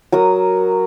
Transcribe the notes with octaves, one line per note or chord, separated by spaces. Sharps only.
F#3 A#4 D#6